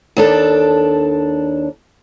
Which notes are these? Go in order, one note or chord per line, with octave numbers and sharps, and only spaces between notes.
D#2 D4 A4